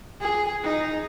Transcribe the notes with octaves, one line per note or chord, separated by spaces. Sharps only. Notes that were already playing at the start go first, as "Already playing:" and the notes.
G#4
D#4